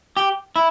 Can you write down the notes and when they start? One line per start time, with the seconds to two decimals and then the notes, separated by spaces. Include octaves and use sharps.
0.17 G4
0.56 E4